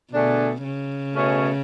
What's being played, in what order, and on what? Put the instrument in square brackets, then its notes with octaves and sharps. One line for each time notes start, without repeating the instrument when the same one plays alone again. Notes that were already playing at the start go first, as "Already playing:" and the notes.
[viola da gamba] B2 [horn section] D3 A3 D4 G#4
[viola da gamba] C#3
[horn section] B2 A3 C#4 G#4